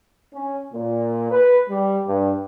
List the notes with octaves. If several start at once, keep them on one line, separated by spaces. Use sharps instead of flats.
C#4
A#2
B4
G3
G2